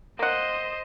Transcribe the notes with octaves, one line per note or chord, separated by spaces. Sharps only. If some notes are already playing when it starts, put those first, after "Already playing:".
A#3 C5 D#5 F#5